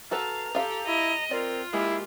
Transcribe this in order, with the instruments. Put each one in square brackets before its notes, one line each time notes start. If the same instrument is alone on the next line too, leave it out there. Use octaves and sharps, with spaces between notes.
[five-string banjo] F#4 A4 B4 [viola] F5 A5 [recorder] A#5
[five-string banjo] F4 F5 [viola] G4 A4
[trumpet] E4 [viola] D#5
[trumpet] C4 [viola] F4 [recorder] A#4 [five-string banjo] D5
[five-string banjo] G#3 A#3 [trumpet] E4 [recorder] G4